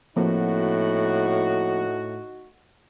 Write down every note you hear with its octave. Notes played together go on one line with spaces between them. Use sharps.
A2 F3 A#3 C4 D#4 F#4